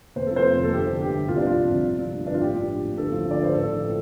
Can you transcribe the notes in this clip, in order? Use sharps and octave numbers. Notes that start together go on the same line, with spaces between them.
F1 C5
F3 A4
C5
F2
F1 A4
G1 G4
D3
G2 G4
G1
C2 F4
D4
F3 F4
C3
C2
G1
F3
G2
G1 D4
F4
A1 G4
F3
G2
A1
D2 A4
F3
D3
D5
D2 C5
A1 A4
F3
A2